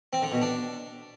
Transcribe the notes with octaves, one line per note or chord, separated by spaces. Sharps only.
C4
D3
B2
D4